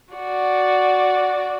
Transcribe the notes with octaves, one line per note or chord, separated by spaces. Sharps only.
F#4 D5